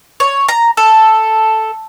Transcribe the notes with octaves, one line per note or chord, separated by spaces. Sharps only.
C#5
A#5
A4